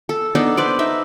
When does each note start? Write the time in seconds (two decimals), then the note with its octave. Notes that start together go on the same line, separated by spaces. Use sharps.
0.09 A4
0.35 B3 D4 D#4 A4
0.57 B4 C5 D5
0.79 D#4 E5